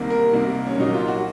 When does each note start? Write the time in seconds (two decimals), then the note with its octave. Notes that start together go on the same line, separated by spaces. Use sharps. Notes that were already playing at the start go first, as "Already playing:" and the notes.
Already playing: C2 C3 D#3 A#3
0.10 A#4
0.33 C2 C3 D#3 A#3
0.67 C#4
0.78 C2 A#2 F#3 A#3 D#4
0.94 F4
1.08 F#4